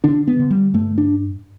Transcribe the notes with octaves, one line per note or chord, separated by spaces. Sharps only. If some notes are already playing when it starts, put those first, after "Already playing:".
D3 D4
B3
D3
G3
G2 A3
D4